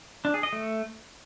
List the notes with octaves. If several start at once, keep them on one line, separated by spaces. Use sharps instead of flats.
D4
G#4
D#5
A3